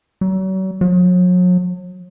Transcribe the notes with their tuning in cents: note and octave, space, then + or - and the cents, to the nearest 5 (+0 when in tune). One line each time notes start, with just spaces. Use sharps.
F#3 +40
F#3 -40